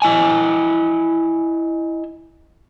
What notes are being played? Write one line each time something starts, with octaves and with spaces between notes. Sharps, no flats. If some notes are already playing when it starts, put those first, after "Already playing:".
E4 D#5 G#5